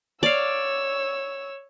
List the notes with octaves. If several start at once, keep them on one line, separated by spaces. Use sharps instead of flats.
C#5 D5 F5 E6